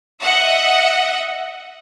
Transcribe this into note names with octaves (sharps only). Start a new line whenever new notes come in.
D#5 E5 F#5